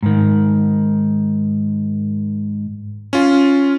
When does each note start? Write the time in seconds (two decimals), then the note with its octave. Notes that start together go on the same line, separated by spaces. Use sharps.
0.03 G#2 D#3
3.13 C#4 F4